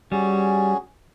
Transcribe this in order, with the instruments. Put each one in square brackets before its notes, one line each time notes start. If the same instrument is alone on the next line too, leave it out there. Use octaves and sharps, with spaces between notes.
[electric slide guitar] G3 [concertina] C#4 F#4 G#4